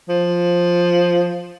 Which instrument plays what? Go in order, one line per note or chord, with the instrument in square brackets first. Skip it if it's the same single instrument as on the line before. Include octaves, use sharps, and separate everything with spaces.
[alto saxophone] F3